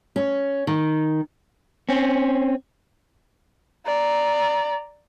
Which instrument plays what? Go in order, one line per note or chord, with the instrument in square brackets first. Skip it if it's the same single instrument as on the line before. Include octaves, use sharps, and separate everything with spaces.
[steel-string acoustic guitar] C#4
D#3
[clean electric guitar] C4 C#4
[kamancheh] D5 A#5